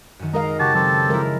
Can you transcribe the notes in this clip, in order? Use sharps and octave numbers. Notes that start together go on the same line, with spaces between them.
F#2 D#3
G#3 A#4 D#5 F5 A#5
C#3 F#4 G4 A5
F#3 C4 G4 A4
F3 G#3 E4 A#4